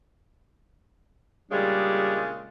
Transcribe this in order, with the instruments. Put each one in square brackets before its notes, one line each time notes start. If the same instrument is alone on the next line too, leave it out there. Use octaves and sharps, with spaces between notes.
[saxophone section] A#2 C#3 G#3 [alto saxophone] G3 [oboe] D4